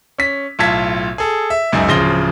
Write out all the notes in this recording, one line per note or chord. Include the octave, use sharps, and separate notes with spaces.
C#4 B6
B1 A2 F4 A5 G#6 B6
G#4 A4
E5
C#2 F#2 D#4 E5 G#5
D1 C#3 F3 C6 A#6 G7